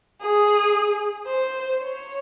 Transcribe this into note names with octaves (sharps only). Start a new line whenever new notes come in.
G#4
C5
C#5